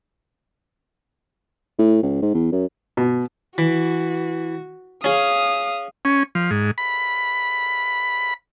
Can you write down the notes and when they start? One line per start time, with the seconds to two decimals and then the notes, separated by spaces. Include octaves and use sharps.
1.79 A2
2.03 C#2
2.22 G#2
2.34 E2
2.52 F#2
2.97 B2
3.58 E3 F#4
5.04 C#4 G#4 F5 D#6
6.05 C#4
6.35 F3
6.51 G#2
6.78 B5